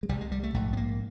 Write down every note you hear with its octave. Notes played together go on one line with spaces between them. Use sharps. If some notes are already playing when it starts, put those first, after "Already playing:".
G#3
C2 C3 G3
G#3
G3
A3
A#1 G#2 A3
B3
A#3